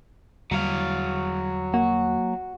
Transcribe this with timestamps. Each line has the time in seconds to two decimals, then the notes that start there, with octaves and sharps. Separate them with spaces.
0.51 E2 D3 F#3 G3 F5
1.74 A#3 F#4